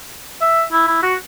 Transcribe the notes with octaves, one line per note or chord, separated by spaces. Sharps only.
E5
E4
E4
F#4